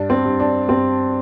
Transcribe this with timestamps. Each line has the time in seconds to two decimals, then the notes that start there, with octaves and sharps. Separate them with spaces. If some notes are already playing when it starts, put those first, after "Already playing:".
Already playing: G2 D4
0.10 C4
0.25 G2
0.40 D4
0.68 G2 C4